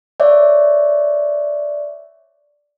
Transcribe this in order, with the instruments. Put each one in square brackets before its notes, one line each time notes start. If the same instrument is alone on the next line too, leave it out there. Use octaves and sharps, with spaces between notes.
[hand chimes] C#5 D5 E5